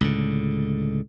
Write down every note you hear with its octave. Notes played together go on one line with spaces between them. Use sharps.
C#2 A2 D3